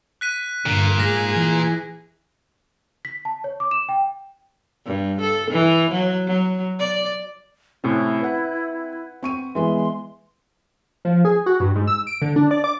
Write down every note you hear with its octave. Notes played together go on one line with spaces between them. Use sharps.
F#6 B6 D#7
G2 A#2 D3
G#2 G#4 A#6
E3
B6
A5
C#5
D6
E7
G5
G2
A4
E3
F#3
F#3
D5
A2 C3 C4 C#4 E4
B4 F#5
C4 C#6 D#7
E3 G#3 B3 C6
F3
G#4
F#4
G2
G#2
E6
D7
D3
D4
D5
D6